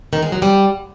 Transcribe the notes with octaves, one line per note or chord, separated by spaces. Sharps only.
D#3
G#3
F#3
G3